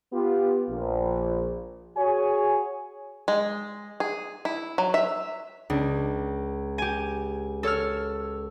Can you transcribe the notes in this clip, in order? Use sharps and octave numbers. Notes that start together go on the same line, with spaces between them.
B3 F4 G4
A#1
F#4 G#4 C#5 G#5
G#3
G#4
E4
F#3
E5
C#2 D4
G4 G#5
A4 C#5 E6 F6